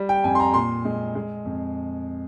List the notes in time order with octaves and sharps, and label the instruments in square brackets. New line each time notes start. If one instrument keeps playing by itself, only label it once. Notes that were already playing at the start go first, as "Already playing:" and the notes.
Already playing: [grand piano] G3
G5
F2 G#5
C6
A#5
A#2 C6
G#3
G#3
F2